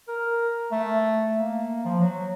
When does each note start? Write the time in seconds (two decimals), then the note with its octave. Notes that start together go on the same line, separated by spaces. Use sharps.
0.08 A#4
0.72 A3
1.38 A#3
1.85 F3
2.00 F#3